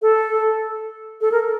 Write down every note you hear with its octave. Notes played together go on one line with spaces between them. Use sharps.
A4
A4
A#4